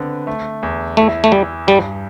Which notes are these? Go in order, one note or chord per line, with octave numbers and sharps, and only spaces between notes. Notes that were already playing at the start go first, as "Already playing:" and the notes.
Already playing: D3 B3 C4
A3
E2
A3 E4
A3
G3 E4
G2 G3